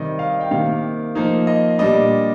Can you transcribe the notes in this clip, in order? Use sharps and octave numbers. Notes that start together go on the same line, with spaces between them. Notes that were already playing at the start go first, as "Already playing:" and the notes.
Already playing: C3 D#3 G3 D#5
F5
D#5
G5
C3 D#3 A#3 F5
F3 A#3 D#4
D#5
A#2 G3 D4 D#5